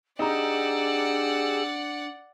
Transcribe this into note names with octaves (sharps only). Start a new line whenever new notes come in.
D4 D#4 G4 G#4 D5 F#5 A#5 E6